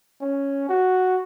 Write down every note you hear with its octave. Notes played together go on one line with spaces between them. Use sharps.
C#4
F#4